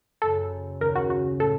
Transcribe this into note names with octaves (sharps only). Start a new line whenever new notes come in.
F#1 F#2 C#3 A4
D#2 C#3 A3 A#4
F#4
F#4
A2 A3 C#4 A4